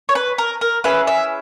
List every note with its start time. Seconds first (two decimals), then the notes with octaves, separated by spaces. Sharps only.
0.09 C#5
0.15 B4
0.38 A#4
0.61 A#4
0.84 C#4 E4 G#4 B4
1.07 E5